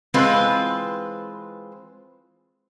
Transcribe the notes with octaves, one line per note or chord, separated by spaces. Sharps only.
E3 G#3 C4 F4 B4